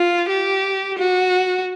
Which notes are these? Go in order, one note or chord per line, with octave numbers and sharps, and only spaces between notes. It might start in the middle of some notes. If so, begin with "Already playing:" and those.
Already playing: F4
G4
F#4